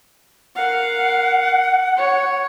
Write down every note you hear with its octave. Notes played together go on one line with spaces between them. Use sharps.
A#4 F5 F#5
C#5